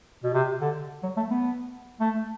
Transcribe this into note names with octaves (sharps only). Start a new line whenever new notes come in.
B2
C3
D3
F#3
A3
B3
A3